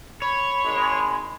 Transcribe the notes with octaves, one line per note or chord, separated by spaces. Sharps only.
C#5 B5
G#1 G#3